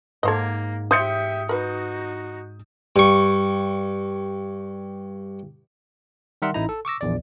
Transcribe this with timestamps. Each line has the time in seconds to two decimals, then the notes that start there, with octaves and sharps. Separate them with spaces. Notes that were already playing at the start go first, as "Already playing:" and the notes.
0.23 G#2 A#3 A4 C5 D#5 D6 G#6
0.91 G4 C5 E5 D#6 G6 C#7
1.49 D#4 F#4 A#4 B4
2.96 G2 C#6
6.42 D#3 G3 A#4 E5 F#5 C6
6.54 A1 D#4 E4 A#5
6.69 A4
6.85 C#6 D6 E6 A#6
7.01 A#1 E2 D5